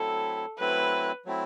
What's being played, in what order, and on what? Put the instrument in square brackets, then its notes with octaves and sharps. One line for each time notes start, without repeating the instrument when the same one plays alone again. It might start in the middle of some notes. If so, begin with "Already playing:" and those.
Already playing: [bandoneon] F#3 A3 C4 E4 [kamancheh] A4
[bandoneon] F#3 A3 C4 E4 [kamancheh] B4
[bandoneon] F#3 A3 C4 E4